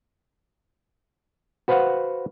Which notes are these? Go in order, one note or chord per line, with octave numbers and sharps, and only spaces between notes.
F#4 B4 C5 F5 F#5